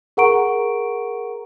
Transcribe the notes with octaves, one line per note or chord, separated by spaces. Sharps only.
G#4 A#4 F#5 A#5 C#6 D7